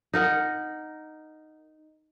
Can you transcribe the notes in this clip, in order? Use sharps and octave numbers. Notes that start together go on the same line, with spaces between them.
D#4 A#4 F#5